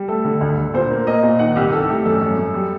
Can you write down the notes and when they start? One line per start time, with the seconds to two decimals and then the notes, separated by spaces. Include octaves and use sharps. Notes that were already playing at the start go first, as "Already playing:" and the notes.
Already playing: G3
0.08 A3 A4
0.25 D3
0.41 D2
0.57 D2
0.74 A#2 C5
0.91 A#3
1.07 A#3 D#5
1.23 A#2
1.39 D#3 F#5
1.56 C2 G4
1.72 C2 A4
1.89 A3 G4
2.05 F#2 A4
2.21 F#2
2.38 F#2
2.54 G3